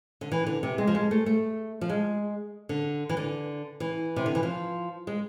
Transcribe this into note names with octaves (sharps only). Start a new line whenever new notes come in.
D3
E3
D3
C3
G#3
F3
G#3
A3
A3
F3
G#3
D3
E3
D3
E3
C3
D3
E3
F3
G#3